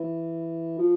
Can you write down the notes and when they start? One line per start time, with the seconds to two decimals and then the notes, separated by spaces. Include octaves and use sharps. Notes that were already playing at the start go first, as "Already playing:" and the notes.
Already playing: E3
0.79 F3